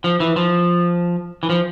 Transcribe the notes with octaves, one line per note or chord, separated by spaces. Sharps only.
F3
E3
F3
E3
F3